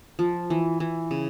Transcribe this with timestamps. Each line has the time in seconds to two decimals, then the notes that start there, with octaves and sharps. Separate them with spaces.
0.19 F3
0.50 E3
0.80 E3
1.11 C#3